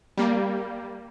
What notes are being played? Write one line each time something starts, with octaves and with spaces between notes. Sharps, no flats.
G3 A#3